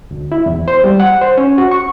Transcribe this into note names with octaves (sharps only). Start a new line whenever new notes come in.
D2
E4
E2
C5
G3
F#5
C5
C#4
F#4
C#6